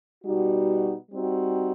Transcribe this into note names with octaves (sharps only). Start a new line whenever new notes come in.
B2 G3 D#4 F#4
G3 C4 D#4 F#4